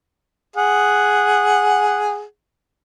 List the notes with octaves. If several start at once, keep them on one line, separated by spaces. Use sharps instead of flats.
G#4 F#5